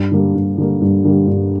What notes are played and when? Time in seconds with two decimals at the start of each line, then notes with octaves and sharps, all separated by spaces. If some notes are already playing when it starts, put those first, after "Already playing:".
Already playing: G2
0.11 D3 G3 A#3
0.35 G2
0.58 D3 G3 A#3
0.81 G2
1.04 D3 G3 A#3
1.27 G2